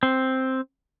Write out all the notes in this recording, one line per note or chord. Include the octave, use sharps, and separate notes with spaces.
C4